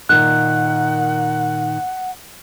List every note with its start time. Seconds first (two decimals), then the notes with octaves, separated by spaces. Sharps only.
0.09 A#2 D#3 F#5 F#6